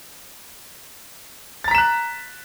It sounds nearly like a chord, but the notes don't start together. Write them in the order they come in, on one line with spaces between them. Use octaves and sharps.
A6 A#5 B6 E7 F#6